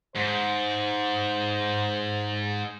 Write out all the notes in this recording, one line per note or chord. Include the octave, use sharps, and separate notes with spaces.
G#2 C5